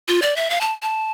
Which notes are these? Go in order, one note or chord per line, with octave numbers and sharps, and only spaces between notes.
F4
D5
E5
F5
A5
A5